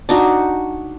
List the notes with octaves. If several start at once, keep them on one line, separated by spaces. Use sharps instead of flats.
D4 D#4 F#4